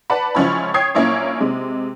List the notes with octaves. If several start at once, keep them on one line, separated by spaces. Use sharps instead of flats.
B4 D5 F#5 A5 B5
C#2 F3 C#4 E4 B5
C#5 G5 D#6 G#6 C7
A#1 A#3 C#4 E4 C#5
C3 G#3